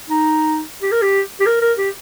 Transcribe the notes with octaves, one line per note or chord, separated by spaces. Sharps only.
D#4
G4
A#4
G4
G4
A#4
A#4
G4